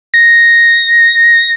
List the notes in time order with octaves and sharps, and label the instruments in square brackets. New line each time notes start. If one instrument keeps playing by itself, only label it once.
[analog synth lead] A#6